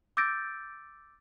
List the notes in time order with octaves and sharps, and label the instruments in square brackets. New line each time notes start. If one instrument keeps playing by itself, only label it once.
[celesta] D6 E6 G6 A6 A#6 D7